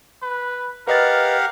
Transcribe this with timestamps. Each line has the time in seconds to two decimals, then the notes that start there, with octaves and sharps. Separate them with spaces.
0.22 B4
0.88 G4 A#4 B4 D#5 F5 F#5 A6